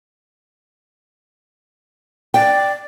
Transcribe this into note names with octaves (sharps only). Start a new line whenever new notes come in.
D5 G5